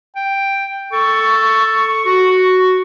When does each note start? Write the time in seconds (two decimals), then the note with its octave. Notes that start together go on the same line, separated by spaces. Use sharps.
0.16 G5
0.93 A4 C#6
2.06 F#4